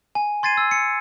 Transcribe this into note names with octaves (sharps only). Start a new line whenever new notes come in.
G#5
C6 G#6 A6 C7 D#7
E6
C#7